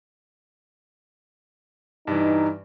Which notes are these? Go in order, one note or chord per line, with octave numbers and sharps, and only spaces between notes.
G2 E3 D#4